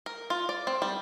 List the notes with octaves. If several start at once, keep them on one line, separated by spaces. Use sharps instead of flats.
A#4
F4
D5
C4
G3